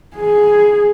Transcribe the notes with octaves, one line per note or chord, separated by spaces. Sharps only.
G#4